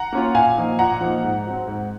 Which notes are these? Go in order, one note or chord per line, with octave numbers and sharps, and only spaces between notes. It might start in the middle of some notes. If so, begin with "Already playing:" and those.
Already playing: F#5 A#5
A#3 C#4 F4
A#2 F5 G#5
F3 A#3 D#4
A#2 F#5 A#5
F3 A#3 D#4
G#2
F#3 C4
G#2